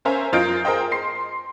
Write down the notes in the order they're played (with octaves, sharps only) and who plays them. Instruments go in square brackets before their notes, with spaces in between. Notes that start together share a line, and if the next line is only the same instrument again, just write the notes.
[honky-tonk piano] C#4 A#4 C5 E5 G#5 A#5
F#2 F4 A#4 D#5 G6 D7
G#4 A#4 C5 D#5 G5
C6 C7